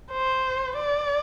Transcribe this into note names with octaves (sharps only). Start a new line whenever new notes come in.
C5
D5